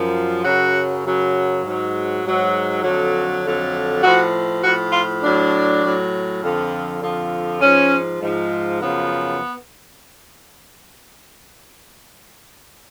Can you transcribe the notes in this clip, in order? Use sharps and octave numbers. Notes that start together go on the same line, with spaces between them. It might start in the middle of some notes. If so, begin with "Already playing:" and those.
Already playing: F#2 F3
F#2 C#3 F#3 F#4
F#2 C#3 F#3
G#2
F#3
G#2 F#3
F2 D3 F#3
F2 D3 F#3
A2 F3 F#4
A2 F3 F#4
F4
A2 F#3 D4
A2 F#3
F2 D3 F3
F2 D3 F3
G#2 F3 C#4
G#2 F3
F#2 C#3 F3 B3